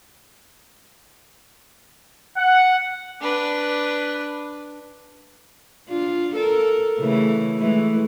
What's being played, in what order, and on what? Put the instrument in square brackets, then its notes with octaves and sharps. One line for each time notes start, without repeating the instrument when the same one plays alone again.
[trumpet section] F#5
[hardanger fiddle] D4 B4
[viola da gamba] D4 F4
A4 A#4
C#3 E3 A3
E3 G#3 A3